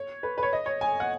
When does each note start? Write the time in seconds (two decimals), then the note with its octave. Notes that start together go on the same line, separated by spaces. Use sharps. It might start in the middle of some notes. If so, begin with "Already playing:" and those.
Already playing: C#5
0.23 B4
0.38 B4
0.43 C#5
0.53 D#5
0.66 C#5
0.81 G#5
1.00 F#5